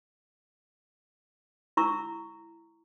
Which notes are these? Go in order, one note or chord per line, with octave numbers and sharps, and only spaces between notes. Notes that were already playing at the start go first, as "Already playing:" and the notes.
E4 A#5 C#6 E6